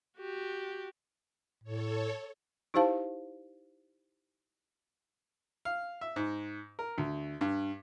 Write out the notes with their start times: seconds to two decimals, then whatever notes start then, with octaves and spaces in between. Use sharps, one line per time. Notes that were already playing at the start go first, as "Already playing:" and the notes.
0.18 F#4 G4
1.64 A2 A4 C#5
2.74 D#4 E4 G4 C5 F5 A5
5.65 F5
6.01 E5
6.16 G#2
6.79 A#4
6.98 D2
7.41 G2